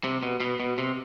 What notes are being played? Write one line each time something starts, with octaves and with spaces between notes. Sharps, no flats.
C3
B2
B2
B2
C3